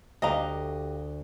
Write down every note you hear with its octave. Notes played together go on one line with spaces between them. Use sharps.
D2 G4 D#5 F5 A#5